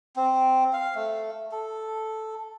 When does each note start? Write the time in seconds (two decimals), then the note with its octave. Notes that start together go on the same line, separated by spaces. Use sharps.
0.16 C4
0.73 F5
0.95 A3
1.52 A4